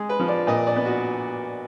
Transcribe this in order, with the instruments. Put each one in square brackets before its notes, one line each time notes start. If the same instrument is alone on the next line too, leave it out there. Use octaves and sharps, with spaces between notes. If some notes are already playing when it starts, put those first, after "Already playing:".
Already playing: [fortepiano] G#3 G#4
B4
F3
D5
A#2 D#5
D5
B3
F#4